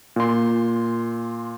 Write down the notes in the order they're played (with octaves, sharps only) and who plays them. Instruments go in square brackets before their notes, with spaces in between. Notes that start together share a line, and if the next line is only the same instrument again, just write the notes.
[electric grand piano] A#2 C6